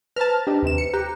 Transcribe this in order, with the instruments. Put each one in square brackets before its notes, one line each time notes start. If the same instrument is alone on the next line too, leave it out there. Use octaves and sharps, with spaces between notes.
[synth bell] B4 C5 A#5 [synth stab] A5 F6
[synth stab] D4 D#4 [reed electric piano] G4
[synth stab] D#2 C3 E7
C#7
[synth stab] G4 [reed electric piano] A#5 [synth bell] F#6